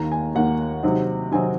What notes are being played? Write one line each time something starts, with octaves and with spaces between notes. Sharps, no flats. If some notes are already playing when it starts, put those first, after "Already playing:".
Already playing: D#2 D#3 A#3 A#5
G#5
D#2 D#3 A#3 F#5
C3 D#3 F#3 C4 D#4
C3 D#3 F#3 C4 D#4 G#5